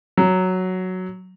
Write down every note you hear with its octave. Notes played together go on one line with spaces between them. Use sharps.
F#3